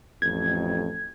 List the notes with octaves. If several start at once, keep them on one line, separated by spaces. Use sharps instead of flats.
A1 F2 G#6